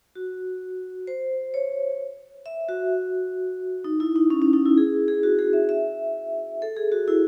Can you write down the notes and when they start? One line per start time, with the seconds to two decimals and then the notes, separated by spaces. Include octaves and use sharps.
0.15 F#4
1.07 C5
1.54 C#5
2.46 E5
2.69 F#4
3.84 D#4
4.00 E4
4.16 D#4
4.30 C#4
4.42 C#4
4.53 D#4
4.66 E4
4.77 G#4
5.08 G#4
5.23 F#4
5.39 G#4
5.53 E5
5.69 E5
6.62 A4
6.77 G#4
6.92 F#4
7.08 E4